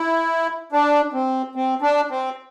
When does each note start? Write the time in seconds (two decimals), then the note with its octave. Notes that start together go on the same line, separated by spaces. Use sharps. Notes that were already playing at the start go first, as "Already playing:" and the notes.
Already playing: E4
0.72 D4
1.13 C4
1.55 C4
1.82 D4
2.10 C4